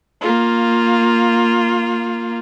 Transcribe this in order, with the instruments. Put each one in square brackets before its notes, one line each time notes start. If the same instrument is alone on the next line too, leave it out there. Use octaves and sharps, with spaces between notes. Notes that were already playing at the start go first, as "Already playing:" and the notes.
[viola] A#3 F4